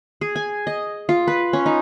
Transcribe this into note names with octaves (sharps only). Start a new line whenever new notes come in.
G#4
G#5
D#5
F4
B4
C#4
D#4